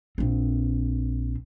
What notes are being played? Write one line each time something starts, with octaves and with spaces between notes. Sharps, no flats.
A#1 C4